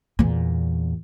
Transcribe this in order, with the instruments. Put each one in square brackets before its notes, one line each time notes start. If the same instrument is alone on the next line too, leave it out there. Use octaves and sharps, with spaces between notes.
[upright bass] E2 A#2